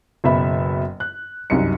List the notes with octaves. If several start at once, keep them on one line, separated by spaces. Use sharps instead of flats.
F#1 B2 E5 B5
F#6
C2 F#2 D#4 C#7